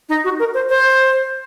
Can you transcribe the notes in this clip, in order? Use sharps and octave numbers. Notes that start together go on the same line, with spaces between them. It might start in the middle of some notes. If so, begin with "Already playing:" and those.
D#4
F#4
A#4
C5
C5